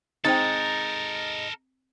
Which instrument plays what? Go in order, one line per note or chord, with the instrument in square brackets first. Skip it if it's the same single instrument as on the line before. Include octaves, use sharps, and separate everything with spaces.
[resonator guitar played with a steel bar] G#3 D#4 [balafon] C4 C5 G5 [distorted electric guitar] A4 A#4 [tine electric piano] A6